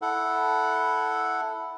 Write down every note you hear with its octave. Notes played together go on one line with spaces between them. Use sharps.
E4 A4 F#5